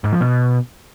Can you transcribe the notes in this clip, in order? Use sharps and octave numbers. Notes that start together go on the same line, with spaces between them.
G#2
F3
B2